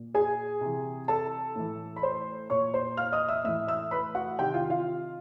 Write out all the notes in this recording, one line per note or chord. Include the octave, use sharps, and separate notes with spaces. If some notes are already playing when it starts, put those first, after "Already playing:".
Already playing: A#2
G#4 G#5
C3 E3
A4 A5
A2 E3
B5
C5 C6
A#2 C#5 C#6
C5 C6
F5 F6
D#5 D#6
E5 E6
A2 E3 E5 E6
E5 E6
B4 B5
F#4 F#5
C3 D#3 G4 G5
F4 F5
F4 F5